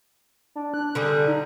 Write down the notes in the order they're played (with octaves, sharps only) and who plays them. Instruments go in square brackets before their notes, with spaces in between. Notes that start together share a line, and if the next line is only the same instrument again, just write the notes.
[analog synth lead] D4
F#6
[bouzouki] D3 G3 G#4
[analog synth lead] D#4